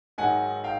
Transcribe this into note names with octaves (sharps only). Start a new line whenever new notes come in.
G#2 D#3 F#3 F#5 G#5
F5 G5